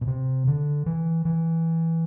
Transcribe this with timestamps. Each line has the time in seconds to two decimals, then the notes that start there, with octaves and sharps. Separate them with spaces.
0.01 B2
0.07 C3
0.47 D3
0.86 E3
1.25 E3